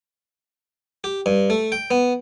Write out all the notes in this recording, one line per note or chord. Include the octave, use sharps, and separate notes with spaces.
G4
G2
A3
G5
B3